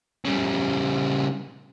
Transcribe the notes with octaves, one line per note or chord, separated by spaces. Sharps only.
C#3 G3